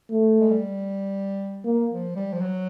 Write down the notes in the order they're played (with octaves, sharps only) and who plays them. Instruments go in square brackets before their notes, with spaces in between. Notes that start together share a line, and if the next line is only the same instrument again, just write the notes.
[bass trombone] A3
[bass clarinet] G#3
G3
[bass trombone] A#3
[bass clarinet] F3
G3
F3
F#3